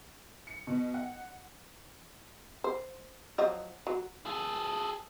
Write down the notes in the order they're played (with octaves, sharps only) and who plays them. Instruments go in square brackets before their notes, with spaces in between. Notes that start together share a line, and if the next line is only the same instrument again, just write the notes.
[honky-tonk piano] C#7
B2
F#5
[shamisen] C5
F3 F#3 D#5
F#3
[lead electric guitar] G#4 A4